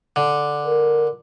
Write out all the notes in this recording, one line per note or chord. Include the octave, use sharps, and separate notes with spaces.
D3
A#4